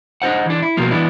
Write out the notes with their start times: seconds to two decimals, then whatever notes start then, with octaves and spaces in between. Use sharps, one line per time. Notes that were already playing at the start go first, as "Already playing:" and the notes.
0.22 D4 D#4 F4 C5 F#5
0.46 E3 D4
0.62 E4
0.77 B2 F3 F#3 A#3
0.91 E3 B3 D4 E4